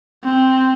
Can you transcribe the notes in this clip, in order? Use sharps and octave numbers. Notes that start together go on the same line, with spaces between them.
C4